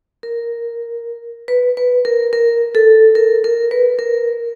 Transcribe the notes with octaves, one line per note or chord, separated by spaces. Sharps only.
A#4
B4
B4
A#4
A#4
A4
A#4
A#4
B4
A#4